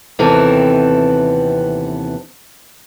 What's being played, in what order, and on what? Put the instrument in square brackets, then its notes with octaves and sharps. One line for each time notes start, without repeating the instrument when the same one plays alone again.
[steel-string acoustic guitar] D#2 C3 E3 B3 C4 A4